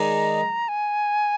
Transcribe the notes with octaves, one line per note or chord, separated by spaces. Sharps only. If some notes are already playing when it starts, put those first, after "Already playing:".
Already playing: D#3 G#3 D#4 G#4 D5 A#5
G#5